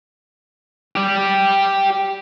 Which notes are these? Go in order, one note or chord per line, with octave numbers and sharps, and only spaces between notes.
G4 D5